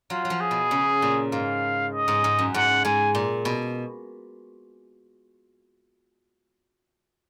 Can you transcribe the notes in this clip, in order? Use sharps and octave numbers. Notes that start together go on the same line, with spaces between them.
F#3 F4
F#3
F3
G#4
B2
C#3
A#2
G#2 F5
D#5
G#2
G#2
F#2
G#2 F#5
G#2 G#5
A#2
B2